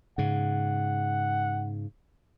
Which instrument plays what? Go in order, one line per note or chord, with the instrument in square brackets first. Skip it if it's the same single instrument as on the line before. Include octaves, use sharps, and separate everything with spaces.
[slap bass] G#2 C#3 [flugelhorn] F#5